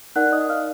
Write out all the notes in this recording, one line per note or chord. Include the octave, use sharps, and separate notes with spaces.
D#4 A#4 D5 F#5 F#6
D#5 D#6
F5 F6